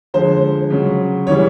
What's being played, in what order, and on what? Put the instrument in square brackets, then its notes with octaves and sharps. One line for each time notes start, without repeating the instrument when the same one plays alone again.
[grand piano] D3 F3 G#3 C5
C#3 F#3
C#3 E3 G3 C#5